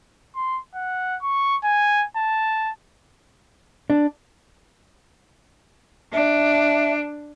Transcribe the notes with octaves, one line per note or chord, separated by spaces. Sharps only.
C6
F#5
C#6
G#5
A5
D4
D4 E5